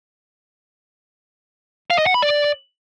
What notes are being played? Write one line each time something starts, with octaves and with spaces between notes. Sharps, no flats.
F5
D#5
F#5
B5
D5